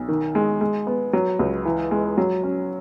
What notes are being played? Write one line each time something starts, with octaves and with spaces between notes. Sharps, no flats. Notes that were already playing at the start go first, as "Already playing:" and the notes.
Already playing: B1
D#3
G#3
G#3
B3
F#3
C#2
E3
G#3
F#3
C#4